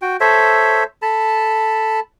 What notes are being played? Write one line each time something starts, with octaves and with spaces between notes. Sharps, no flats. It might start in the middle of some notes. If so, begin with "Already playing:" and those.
F#4 G5
A4 C5 C#5 E5
A4 A5 B5